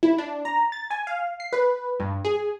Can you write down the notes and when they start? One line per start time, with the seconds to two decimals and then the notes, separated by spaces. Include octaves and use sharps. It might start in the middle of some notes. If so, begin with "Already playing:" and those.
0.03 E4
0.18 D4
0.45 A#5
0.72 A6
0.91 G#5
1.07 F5
1.40 C7
1.53 B4
2.00 G2
2.25 G#4